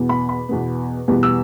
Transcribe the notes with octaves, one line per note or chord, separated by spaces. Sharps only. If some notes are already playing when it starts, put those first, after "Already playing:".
Already playing: E2 B2 B3
B5
B5
E2 B2 B3
E2 B2 G3 B3
E6